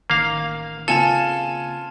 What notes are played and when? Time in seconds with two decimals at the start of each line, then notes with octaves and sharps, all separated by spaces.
0.10 A1 D#3 A#3 F5
0.88 C#3 A#3 C4 F4 A4 G#5 A5 E7